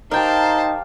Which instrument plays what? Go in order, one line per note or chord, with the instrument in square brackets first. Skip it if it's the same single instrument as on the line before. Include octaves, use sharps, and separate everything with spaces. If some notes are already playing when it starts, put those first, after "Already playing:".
[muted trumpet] D#4 [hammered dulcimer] G4 F5 [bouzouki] A#4 G5 [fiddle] C5 A5